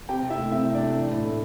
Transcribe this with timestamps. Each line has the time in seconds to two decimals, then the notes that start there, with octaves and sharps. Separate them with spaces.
0.09 C4 G4 G5
0.23 C3
0.30 E4 E5
0.37 A3
0.52 C4 E4 E5
0.67 C3
0.73 D4 D5
0.81 A3
0.96 E3
1.10 A2
1.25 A2